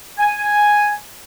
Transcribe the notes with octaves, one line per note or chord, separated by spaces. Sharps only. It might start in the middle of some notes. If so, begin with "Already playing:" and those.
G#5